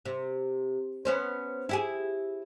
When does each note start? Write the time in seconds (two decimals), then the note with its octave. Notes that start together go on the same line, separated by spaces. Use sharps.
0.05 C3
1.05 B3 C#4 C5
1.69 E4 G4 G#4